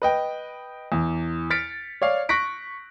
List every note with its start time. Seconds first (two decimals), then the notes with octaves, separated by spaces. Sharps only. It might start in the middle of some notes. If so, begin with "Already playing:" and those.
0.02 B4 D#5 G5
0.92 E2
1.50 F6 A6 B6 C#7 D7
2.02 C#5 D5 F5
2.29 C#6 F#6 A#6 B6 D7